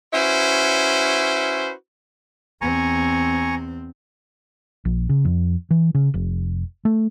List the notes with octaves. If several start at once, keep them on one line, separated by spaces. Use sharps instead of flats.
C#4 E4 F#4 B4 C5
E2 C4 G#5 A#5 C#6
A#1
C#3
F2
E3
C#3
F1
A3